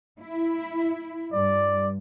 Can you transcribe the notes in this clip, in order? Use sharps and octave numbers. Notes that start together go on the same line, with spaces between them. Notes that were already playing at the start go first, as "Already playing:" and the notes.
E4
G2 D5